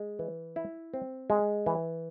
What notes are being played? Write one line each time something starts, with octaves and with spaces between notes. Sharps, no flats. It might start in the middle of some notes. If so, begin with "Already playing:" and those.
Already playing: G#3
E3
E4
C4
G#3
E3